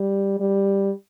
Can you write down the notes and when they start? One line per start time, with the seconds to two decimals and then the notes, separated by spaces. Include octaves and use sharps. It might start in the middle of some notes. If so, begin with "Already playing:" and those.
Already playing: G3
0.40 G3